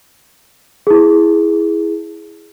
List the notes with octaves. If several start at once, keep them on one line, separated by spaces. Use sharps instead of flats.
E4 G#4